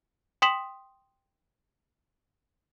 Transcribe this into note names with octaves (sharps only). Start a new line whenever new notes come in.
G5 C6 D#6 B6 E7 F#7